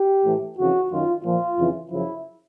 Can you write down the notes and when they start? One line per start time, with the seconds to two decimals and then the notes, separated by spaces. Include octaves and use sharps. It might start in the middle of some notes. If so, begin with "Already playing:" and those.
Already playing: G4
0.25 A2 E3
0.58 F2 C#3 E3 F#4
0.91 F#2 D#3 F4
1.25 A#2 F3 F4
1.58 F2 C#3 E3
1.91 F#2 C#3 F3 E4